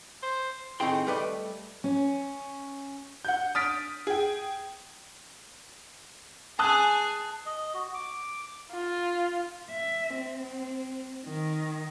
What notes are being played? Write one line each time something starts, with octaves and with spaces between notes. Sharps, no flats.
C5
A2 D#3 C4 G#4 G5 C6
G3 A3 B4 D5 D#5
C#4
F#5 G6
D#6 F6 A6 B6 D7
G#4 G5
G#4 G#5 A5 D#6 F#6
D#5
F#4
D6
F4
E5
C4
D#3